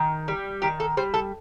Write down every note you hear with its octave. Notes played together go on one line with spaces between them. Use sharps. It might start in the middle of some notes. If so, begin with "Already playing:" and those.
Already playing: D#3
G3
D#3 G4
A4
G3 C5
A4